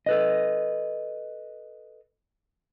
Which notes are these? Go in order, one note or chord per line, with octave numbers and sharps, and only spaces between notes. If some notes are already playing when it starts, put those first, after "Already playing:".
A4 B4 D#5